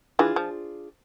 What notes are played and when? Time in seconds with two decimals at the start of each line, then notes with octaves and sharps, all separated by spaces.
0.19 E3 D4 F4 G#4
0.36 F3